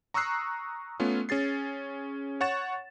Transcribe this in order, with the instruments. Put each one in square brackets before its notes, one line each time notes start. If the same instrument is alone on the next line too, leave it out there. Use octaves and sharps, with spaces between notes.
[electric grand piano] A#5 C#6 D#6 E6 F#6 C7
A3 B3 C#4 F4
C#4 G#4 A6 C7
C#5 F#5 C#6 A6 E7